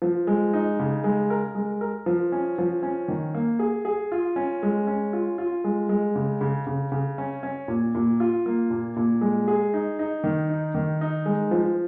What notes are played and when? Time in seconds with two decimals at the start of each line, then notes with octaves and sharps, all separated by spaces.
0.02 F3
0.27 G#3
0.53 D#4
0.79 C#3
1.04 G#3
1.30 A#4
1.55 G#3
1.81 A#4
2.06 F3
2.32 C#4
2.58 F3
2.83 C#4
3.08 D#3
3.34 A#3
3.59 G#4
3.85 G#4
4.12 F4
4.36 C#4
4.63 G#3
4.87 C#4
5.13 F4
5.38 F4
5.64 G#3
5.89 G#3
6.15 C#3
6.41 C#3
6.67 C#3
6.92 C#3
7.18 C#4
7.43 C#4
7.68 A#2
7.95 A#2
8.20 F4
8.46 A#3
8.70 A#2
8.96 A#2
9.21 G#3
9.48 G#4
9.74 D#4
9.99 D#4
10.24 D#3
10.50 D#4
10.75 D#3
11.01 D#4
11.26 G#3
11.51 F3